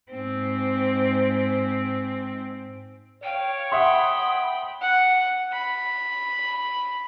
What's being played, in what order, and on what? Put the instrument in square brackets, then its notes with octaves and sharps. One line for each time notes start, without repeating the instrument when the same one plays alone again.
[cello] G#2 C4
[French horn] C#5 [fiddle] F5 [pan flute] G5
[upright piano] E5 F#5 C6 [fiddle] G5 B5 [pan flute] D#6
[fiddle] F#5
B5